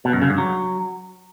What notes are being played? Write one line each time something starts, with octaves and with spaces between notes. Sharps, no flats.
B2
F#2
C#3
G2
F#3